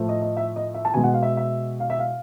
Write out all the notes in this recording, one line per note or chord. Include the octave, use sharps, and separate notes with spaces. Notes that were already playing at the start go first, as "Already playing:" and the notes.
Already playing: A2 F3 A3
D#5
D#5
E5
D#5
E5
A5
B2 G#3 G#5
F#5
F5
E5
E5
F5
E5
F5